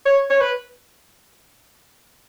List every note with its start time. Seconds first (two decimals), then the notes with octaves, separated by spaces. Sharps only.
0.06 C#5
0.30 C#5
0.41 B4